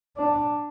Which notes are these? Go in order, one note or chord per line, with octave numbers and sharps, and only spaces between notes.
D4